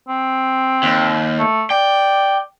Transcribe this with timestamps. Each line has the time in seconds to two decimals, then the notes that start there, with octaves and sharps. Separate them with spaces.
0.08 C4
0.83 D#2
1.39 A3
1.70 D5 G5